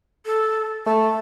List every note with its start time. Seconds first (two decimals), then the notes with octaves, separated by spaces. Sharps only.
0.26 A4
0.86 A3 A5